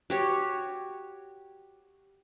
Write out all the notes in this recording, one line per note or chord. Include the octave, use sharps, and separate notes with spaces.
F#4 G4 C#5